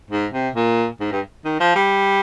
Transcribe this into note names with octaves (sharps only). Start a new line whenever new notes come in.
G#2
C3
A#2
G#2
G2
D#3
F3
G3